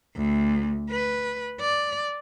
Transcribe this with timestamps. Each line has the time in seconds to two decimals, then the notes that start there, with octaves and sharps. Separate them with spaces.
0.16 D2
0.91 B4
1.60 D5